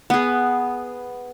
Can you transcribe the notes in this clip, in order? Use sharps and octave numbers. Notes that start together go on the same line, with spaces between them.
B3 G#4